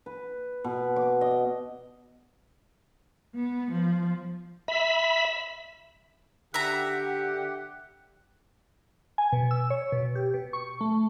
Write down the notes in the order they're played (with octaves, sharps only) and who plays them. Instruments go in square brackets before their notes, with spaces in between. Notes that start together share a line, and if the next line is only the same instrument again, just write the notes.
[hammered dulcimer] B4
B2
D6
D#5
[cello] B3
F3
[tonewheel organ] E5 B5
[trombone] D3 [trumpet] G4 [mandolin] E5 A#5 [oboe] F#5
[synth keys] G#5
B2
E6
C#5
B2
G4
B2
C#6
A3